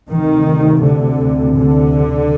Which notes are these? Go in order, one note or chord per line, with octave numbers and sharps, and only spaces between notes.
D2 C3 D#3
D3
D3